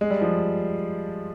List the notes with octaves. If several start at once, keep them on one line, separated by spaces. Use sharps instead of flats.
G#3
G3
F3